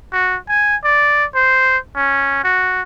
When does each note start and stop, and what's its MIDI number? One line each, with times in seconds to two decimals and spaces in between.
0.13 0.37 66
0.49 0.76 80
0.84 1.25 74
1.35 1.77 72
1.96 2.42 61
2.44 2.82 66